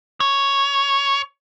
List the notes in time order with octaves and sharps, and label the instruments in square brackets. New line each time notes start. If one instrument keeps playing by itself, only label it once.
[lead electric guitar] C#5